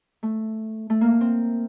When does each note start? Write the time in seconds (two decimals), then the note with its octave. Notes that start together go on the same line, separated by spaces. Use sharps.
0.23 A3
0.90 A3
1.01 A#3
1.21 C4